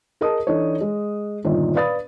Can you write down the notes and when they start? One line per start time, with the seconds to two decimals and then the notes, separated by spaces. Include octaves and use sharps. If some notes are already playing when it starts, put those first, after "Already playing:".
0.21 G#4 A#4 D#5 A5 D#6
0.47 E3 D4 D#4 A4 C#5
0.81 G#3
1.45 G1 A#2 D#3
1.75 B4 D5 F5 B5 D#6 A6